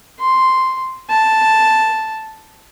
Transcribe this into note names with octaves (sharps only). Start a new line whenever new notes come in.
C6
A5